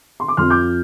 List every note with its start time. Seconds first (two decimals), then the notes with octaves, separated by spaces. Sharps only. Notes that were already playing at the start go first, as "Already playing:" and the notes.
0.20 C6
0.28 D6
0.37 F2 F3 C6 F6
0.50 D6 G6